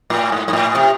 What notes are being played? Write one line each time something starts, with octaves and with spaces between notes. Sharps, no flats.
A2
G#2
G#2
A2
C3